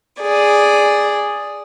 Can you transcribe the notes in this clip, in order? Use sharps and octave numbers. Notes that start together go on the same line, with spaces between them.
G#4 D5